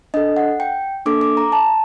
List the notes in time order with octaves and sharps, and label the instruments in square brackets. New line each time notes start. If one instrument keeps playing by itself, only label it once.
[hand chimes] D4 A4 D#5
F#5
G5
A#3 D4 A4 D6
D6
A#5
A5